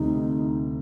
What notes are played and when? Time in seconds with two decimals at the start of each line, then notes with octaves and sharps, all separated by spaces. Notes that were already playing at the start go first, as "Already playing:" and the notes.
Already playing: D2 C3 G3 D#4